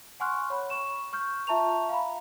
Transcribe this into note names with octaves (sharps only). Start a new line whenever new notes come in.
F#5 G#5 C6 C#6 F6 F#6
C#5 B5
C#6 E7
C#6 F6 G6
F4 E5 A5 A#5 C#6 F7
F5 A#5 B5